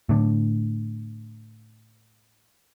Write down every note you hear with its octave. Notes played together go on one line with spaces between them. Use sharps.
A2 D3